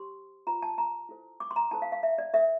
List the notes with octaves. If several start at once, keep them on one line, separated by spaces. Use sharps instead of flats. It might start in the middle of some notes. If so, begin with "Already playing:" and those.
Already playing: G4 C5 C6
F4 C5 A#5
A5
A#5
E4 A4 C5
D6
C6
A#5
E4 A4 C5 A5
F5
F5
E5
D5
D4 A4 C5 E5